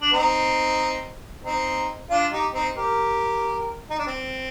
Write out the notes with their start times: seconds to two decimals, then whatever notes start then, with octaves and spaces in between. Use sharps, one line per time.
0.02 D4
0.13 C4 D#4
1.44 C4 D#4
2.10 D4 F4
2.32 D#4 G4
2.54 C4 D#4
2.77 G4 A#4
3.90 D#4
3.99 D4
4.07 C4